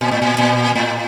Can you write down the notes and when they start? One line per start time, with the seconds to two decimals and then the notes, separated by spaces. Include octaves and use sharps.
0.01 A#2
0.11 A2
0.22 A#2
0.38 A#2
0.75 A2